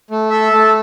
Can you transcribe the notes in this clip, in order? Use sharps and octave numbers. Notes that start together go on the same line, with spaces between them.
A3
A4 E5
A3 A5